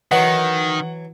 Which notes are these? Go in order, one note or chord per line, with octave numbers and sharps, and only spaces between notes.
D#3 E3 F#3 F#5